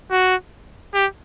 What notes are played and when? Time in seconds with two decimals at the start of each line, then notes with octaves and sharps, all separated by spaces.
0.11 F#4
0.94 G4